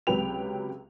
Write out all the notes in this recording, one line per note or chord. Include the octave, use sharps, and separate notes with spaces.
C#2 C3 F#3 B4 G5 F7